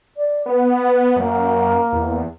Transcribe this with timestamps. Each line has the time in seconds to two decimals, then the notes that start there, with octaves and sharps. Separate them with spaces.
0.16 D5
0.46 B3 B4
1.16 F#2 A#3
1.92 E2